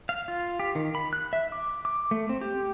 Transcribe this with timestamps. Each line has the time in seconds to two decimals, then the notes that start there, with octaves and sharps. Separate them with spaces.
0.09 F5
0.28 F4
0.59 G4
0.75 D#3
0.95 B5
1.13 F#6
1.33 E5
1.52 D6
1.85 D6
2.11 A3
2.29 C4
2.41 G4